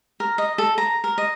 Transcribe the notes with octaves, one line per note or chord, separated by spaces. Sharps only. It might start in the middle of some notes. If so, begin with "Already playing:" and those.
A#4
D#5
A4
A#5
A#4
D#5